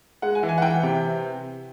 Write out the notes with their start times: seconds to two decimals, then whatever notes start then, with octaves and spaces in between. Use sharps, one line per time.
0.22 G#3 F#5
0.35 G#5
0.43 E3
0.49 G#5
0.58 F#5
0.62 E3 G5
0.83 C3